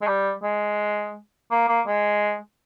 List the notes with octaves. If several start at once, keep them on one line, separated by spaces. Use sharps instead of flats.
G#3
G3
G#3
A#3
A#3
G#3